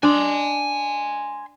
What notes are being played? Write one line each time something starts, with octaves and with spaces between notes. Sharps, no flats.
D4 G#5 C6